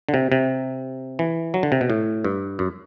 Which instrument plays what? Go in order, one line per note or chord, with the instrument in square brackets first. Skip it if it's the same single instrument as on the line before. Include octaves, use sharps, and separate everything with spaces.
[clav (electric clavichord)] D3
C3
C3
E3
F#3
D3
C3
B2
A2
G2
F#2